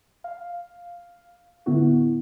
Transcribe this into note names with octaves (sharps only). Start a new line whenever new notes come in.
F5
A2 D3 B3 E4 F#4